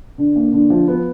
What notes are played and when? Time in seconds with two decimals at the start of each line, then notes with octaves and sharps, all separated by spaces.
0.18 D3
0.36 A#3
0.53 D3
0.70 F3
0.88 B3